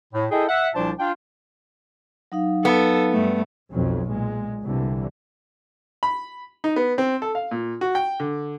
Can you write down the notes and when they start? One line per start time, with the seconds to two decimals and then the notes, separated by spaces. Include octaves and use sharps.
0.14 A2
0.31 E4 G#4 A4 D#5 G5
0.49 E5 F#5
0.75 C2 A#2 F3 D4 C5 A5
0.99 D4 F4 G5
2.32 F#3 D#4 F5
2.65 B3 A4
3.12 G2 A3
3.71 B1 F2 F#3
4.08 A#2 G#3
4.63 C2 D3 E3
6.03 B5
6.64 D#4
6.76 B3
6.98 C4
7.22 A4
7.35 F5
7.51 A#2
7.81 F#4
7.95 G5
8.20 D3